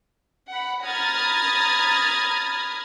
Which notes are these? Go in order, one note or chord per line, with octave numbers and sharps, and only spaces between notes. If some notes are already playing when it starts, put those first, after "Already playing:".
F#5 B5
A#5 B5 D#6 F6 G#6 A6